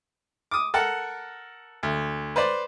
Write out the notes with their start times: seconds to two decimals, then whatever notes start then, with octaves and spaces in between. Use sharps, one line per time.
0.51 D6 D#6
0.74 A4 A#4 F#5
1.83 D2
2.36 B4 C5 D5